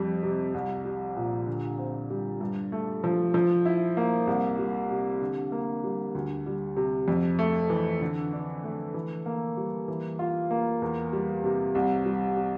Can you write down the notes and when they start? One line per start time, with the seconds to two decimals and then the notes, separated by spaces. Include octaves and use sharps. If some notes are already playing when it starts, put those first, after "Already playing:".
Already playing: F2 G3
0.23 C3
0.54 C2
0.85 G3
1.16 A#2
1.47 D3
1.78 C4
2.10 G3
2.40 G2
2.72 A3
3.04 F3
3.34 F3
3.65 E4
3.97 A#3
4.27 C2
4.59 G3
4.90 C3
5.21 D3
5.52 A#3
5.84 G3
6.15 D2
6.46 G3
6.76 C3
7.08 F2
7.39 A3
7.70 E3
8.01 D3
8.33 D4
8.64 A3
8.94 E3
9.26 A#3
9.57 G3
9.88 E3
10.19 F4
10.51 A#3
10.82 E2
11.13 G3
11.44 C3
11.75 C2
12.06 G3
12.37 C3